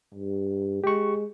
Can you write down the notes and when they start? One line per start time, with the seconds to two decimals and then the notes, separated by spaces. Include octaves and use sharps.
0.14 G2
0.84 G#3 G4 C#6